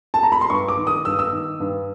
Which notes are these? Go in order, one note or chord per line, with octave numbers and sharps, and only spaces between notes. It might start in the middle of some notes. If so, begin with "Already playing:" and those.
A5
A#5
B5
C6
G2 C#6
D6
D#3
D#6
G2 E6
E6
D#3
G2